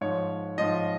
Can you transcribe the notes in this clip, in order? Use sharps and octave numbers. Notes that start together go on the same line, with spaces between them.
G#2 F3 C#5
G#2 F3 D#5